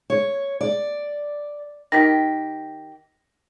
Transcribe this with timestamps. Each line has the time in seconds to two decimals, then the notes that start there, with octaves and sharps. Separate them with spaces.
0.10 C#5
0.61 D5
1.92 D#3 G4 A#6 B6